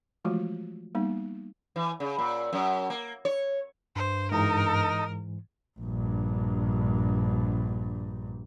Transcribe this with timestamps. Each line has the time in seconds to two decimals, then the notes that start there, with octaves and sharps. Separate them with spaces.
0.25 E3 F3 G#3 A3 F4 F#4
0.95 G3 A#3 B3 D#4
1.76 E3
2.00 C#3
2.18 A#2
2.53 F#2
2.90 A#3
3.25 C#5
3.96 G2 C5
4.32 G#2 E3 D#4 A#4 D#5
5.79 A#1 G2